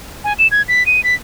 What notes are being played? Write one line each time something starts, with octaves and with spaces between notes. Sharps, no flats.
G#5
E7
G#6
B6
D#7
B6